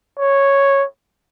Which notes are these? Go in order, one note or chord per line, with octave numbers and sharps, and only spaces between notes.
C#5